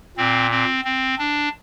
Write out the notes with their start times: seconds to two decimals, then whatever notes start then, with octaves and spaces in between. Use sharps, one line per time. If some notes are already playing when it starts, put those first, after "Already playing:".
0.17 A#2 C4
0.51 C4
0.85 C4
1.19 D4